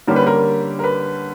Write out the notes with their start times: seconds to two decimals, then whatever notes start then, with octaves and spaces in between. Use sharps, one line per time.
0.07 D3 G3 A#3 C#4 G4 A#4
0.16 B4
0.27 A#4
0.79 A#4
0.84 B4